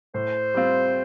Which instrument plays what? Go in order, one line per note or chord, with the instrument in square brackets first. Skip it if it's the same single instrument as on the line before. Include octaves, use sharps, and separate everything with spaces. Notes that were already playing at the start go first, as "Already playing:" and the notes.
[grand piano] A2 [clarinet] C5
[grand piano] G3 C4 F4